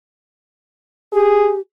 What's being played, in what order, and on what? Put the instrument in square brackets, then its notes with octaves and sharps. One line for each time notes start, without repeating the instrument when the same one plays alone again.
[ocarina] G4 [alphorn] G#4